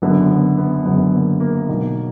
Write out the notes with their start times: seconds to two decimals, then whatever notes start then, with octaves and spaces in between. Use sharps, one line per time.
0.02 F#1 F#2 D3 B3
0.30 B3
0.58 B3
0.85 F#1 F#2 D3 B3
1.14 A#3
1.40 A#3
1.68 B1 B2